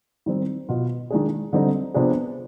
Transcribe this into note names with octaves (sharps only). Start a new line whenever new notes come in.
D#3 G3 C4
B2 B3 F4
D#3 G#3 D4 G#4
D3 G3 C4 D#4
C3 F3 B3 D4 G#4